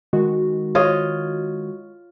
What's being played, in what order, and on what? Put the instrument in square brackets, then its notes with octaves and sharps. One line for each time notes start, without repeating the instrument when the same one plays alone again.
[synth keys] D#3 G#3 F#4
[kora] F4 C#5 D#5